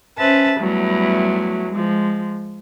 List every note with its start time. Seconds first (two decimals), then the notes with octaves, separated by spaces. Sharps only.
0.18 C#4 B4 C5 E5 A5
0.59 E2 F#3 G3 A3
1.71 F3 G#3